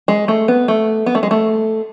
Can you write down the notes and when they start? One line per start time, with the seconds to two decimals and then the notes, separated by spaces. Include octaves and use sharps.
0.08 G#3
0.28 A3
0.48 B3
0.68 A3
1.06 B3
1.15 A3
1.23 G#3
1.31 A3